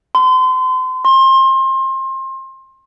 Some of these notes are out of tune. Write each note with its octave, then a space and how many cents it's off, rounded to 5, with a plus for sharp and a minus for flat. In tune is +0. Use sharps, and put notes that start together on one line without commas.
C6 -35
C6 +30